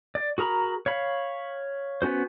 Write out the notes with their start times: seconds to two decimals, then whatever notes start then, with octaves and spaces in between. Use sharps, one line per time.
0.15 D5
0.38 F#4 G#4 A#4 A#5 B5
0.86 C#5 F5 B5
2.02 B3 C#4 F#4 C5